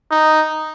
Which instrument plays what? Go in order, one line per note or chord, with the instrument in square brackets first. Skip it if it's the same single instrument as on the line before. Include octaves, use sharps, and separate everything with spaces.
[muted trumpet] D#4